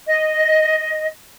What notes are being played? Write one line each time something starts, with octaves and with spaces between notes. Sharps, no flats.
D#5